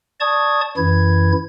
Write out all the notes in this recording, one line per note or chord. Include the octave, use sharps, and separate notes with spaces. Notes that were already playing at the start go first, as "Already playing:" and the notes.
D5 A5 C#6 D#6 G#6
F#2 E3 E4 G#6